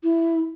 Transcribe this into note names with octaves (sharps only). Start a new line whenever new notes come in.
E4